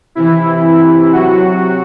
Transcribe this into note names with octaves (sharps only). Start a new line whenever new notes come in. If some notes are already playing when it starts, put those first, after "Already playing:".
C3 E3 E4
C3 F#3 F#4